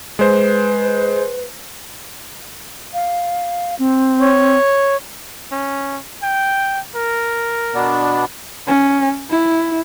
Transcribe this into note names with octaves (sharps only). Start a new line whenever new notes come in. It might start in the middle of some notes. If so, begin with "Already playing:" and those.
G#3 B4 C5
F5
C4
C#5
C#4
G5
A#4
B2 B3 D4
C#4
E4